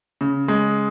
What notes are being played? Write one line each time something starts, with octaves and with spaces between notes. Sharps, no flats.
C#3
G#3